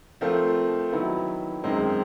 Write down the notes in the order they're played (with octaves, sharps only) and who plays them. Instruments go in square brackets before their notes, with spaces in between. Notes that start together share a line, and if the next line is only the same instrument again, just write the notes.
[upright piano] F3 A3 C4 F4 A#4
D#3 F#3 B3 E4
F#2 D#3 G#3 C4